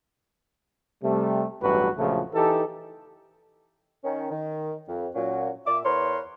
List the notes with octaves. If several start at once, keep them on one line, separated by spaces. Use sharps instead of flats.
C3 G3 A3
A1 E2 G2 F#3 F#4 B4
A#1 F2 C#3 F3 F#3 A3
E3 D#4 G4 A4
D#3 C#4
D#3
F2
A#2 F#3 C#4
A#2 E5 D6
E2 A#4 B4 C#5 C6